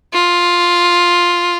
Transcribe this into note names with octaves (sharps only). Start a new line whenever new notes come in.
F4